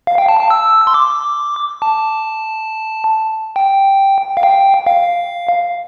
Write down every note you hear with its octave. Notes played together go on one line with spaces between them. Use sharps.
F5
G5
A5
A5
E6
C6
D6
A5
G5
F5
G5
F5